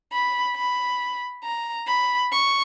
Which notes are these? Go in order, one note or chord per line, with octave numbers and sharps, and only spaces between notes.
B5
B5
A#5
B5
C#6